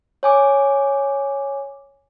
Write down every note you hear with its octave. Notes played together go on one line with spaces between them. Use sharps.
C#5 G#5 D6